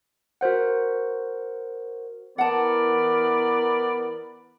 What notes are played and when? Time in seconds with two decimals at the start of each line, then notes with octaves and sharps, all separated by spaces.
0.41 F#4 A#4 C5 F#5
2.38 E3 B3 A#4 D5 F#5 A5